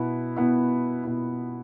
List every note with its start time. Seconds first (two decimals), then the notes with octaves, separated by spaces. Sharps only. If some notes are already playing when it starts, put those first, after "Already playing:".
Already playing: B2 B3 E4
0.37 B2 B3 E4
1.03 B2 B3 E4